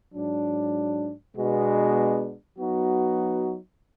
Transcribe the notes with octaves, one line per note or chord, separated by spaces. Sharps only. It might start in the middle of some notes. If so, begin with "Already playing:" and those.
G#2 F#3 D4
B2 G#3 B3 D4 F#4
F#3 B3 D#4 F#4